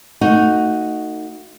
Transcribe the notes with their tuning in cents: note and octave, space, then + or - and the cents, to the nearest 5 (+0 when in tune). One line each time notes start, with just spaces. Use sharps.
A3 +35 D#4 +0 F#4 +0